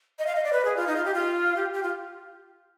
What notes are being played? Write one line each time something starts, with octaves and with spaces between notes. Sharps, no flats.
D#5
F5
D#5
D5
B4
G#4
F4
D#4
F4
G4
F4
G4
G4
F4